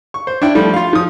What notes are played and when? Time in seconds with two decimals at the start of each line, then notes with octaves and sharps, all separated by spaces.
0.14 C#6
0.27 C5
0.42 D4 E4 G5
0.55 F3 G3 A3
0.73 F4 F5
0.93 F3 D#6